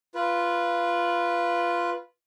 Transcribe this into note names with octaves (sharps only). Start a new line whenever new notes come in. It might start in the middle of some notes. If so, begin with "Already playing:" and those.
F4 B4